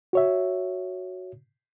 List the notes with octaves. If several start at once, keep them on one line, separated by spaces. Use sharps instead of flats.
F#4 C#5 E5